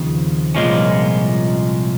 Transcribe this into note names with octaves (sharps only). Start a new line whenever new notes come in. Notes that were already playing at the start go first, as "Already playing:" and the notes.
Already playing: D#2 C#3 F3 C4
C2 A#2 F3 G#3 C#4